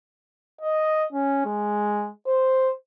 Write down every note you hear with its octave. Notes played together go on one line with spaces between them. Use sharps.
D#5
C#4
G#3
C5